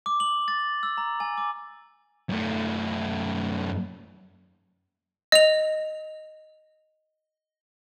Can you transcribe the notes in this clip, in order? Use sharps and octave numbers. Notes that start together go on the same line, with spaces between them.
D6
F#7
A6
E6
A#5
G#5
D6
F#2 A3
D#5 F7